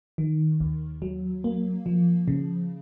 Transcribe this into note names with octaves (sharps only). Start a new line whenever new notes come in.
D#3
D#2
F#3
A#3
F3
C#3